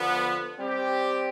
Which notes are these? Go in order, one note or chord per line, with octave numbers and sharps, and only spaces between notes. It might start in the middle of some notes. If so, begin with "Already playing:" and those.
Already playing: D3 F3 B3
G3 C4 G4